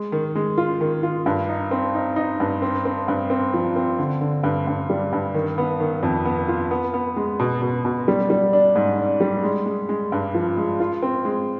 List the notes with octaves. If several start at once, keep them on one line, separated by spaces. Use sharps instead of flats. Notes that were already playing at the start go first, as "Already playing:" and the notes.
Already playing: G#3
D#3
G#3
F4
D#3
F4
G2
D#4
C4
D#4
D#4
G2
C4
C4
G2
C4
F3
C4
D3
D3
G2
G2
G3
G2
D#3
B3
D#3
F2
B3
F4
B3
B3
G#3
B2
B2
B2
G3
G3
D4
G#2
D4
G3
G#3
G#3
G#3
G2
F3
G#3
F4
C4
G#3